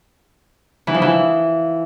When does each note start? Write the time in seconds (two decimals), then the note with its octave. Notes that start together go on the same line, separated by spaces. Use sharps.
0.87 E3
0.94 F3
1.02 E3